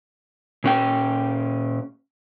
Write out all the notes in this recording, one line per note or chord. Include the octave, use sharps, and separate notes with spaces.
A#2 C#4 G5